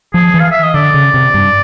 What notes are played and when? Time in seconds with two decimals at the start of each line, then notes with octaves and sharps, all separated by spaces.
0.14 F3 G#4
0.34 E3
0.40 F5
0.51 E5
0.63 D#5
0.74 D3 D5
0.94 C#3
1.14 C3
1.34 G2